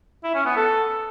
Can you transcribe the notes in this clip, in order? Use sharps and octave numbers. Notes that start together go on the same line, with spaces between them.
E4
C#4
B3
A4